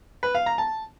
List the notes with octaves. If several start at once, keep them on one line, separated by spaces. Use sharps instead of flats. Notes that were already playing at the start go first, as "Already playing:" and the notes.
B4
F5
A#5
A5